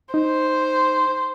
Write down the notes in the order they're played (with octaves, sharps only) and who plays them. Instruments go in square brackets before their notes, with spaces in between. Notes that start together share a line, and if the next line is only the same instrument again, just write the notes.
[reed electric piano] D#4 [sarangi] C5